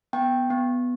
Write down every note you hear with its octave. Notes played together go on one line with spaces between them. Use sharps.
B3 G5
B3